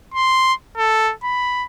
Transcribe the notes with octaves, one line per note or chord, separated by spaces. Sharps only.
C6
A4
B5